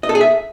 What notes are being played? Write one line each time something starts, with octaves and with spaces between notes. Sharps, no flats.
D#5
A4
G#4
E5